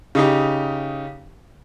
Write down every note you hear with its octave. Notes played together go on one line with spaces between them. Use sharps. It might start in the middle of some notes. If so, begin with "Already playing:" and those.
C#3 D#4 G4